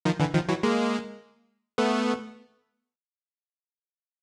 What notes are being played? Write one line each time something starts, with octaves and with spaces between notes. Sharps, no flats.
D#3 F3
D3 E3
D#3 F3
E3 F#3
G#3 A#3
A3 B3